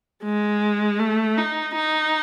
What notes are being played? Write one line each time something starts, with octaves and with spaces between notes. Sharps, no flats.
G#3
A3
D#4
D#4